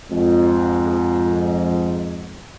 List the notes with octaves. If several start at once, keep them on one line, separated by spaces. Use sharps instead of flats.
F2 G#2